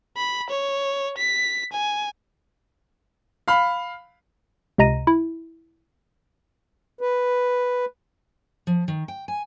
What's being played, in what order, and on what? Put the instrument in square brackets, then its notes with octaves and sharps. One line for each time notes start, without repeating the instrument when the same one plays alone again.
[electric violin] B5
C#5
B6
G#5
[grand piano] F5 B5
[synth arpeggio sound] C#2 C3 D#5 A#5 A#6 D#7
E4
[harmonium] B4
[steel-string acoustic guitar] F3
D#3
G5
G#5